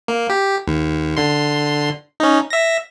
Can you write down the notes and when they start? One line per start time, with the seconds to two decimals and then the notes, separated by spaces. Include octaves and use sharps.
0.08 A#3
0.30 G4
0.68 D#2
1.17 D3 C6
2.20 C#4 D#4
2.50 E5 A#6